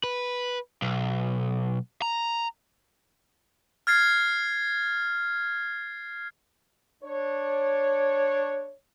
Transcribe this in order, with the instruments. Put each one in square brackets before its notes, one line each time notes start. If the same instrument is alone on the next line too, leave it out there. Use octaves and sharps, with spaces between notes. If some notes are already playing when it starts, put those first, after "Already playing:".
[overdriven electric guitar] B4
B1
A#5
[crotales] F6 G#6 A6 C7
[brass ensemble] D4 C#5